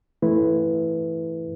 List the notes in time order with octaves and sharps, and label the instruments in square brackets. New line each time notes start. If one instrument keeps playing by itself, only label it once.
[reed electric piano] E3 A3 E4 B4